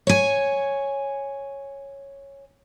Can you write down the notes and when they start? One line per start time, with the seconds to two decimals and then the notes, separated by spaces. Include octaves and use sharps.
0.07 C#5 G#5